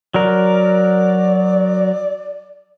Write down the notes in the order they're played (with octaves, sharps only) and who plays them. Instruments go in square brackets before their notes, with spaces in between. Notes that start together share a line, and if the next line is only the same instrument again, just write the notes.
[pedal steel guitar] F#3 A#4 [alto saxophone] D5